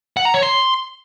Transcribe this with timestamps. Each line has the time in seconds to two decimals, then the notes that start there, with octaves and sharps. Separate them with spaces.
0.17 F#5
0.25 A#5
0.34 C#5
0.43 C6